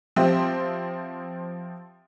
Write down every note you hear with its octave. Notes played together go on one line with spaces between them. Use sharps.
F3 C4 G4 C5 E5